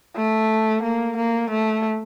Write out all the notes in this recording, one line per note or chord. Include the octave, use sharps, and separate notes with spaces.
A3
A#3
A#3
A3